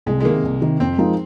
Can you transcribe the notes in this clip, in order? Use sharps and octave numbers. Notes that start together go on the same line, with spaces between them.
C2 G#3
G#3
C3 D#3 A#3
C2
C3 D#3
F2 C4
F3 G#3 D#4 A#4